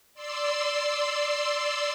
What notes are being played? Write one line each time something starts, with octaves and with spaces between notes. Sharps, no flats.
D5 C6 E6